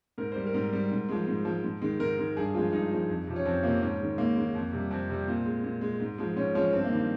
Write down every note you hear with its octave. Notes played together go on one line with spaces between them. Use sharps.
G#2 A#4
G3 C5
A#4
G#2
G3
G#2
F3 G#3
G#2
F3 G#3
G#2
D#3 G#3
G#2 A#4
D#3 G#3
G2 G#4
F3 G#3 F4
G2 D#4
F3 G#3
F2
C3 F3
C#4
F2 C4
C3 F3 A#3
G#2 C#4
D#3 G#3
G#2 A#3
D#3 G#3
F2
C3 G3
F2 C4
C3 G3
A#2
G#3
A#2
G#3
G#2
F3 G#3
G#2 C#4
F3 G#3 C#4
G2 C4
A#3
D#3 G3 C4